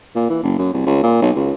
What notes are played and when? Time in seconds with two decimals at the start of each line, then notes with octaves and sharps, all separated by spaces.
0.15 A#2
0.30 E3
0.43 F#1
0.59 F#2
0.73 C2
0.86 C#2
1.03 A#2
1.22 B1
1.36 C#2